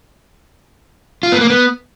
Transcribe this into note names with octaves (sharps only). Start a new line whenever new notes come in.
F4
B3
A#3
B3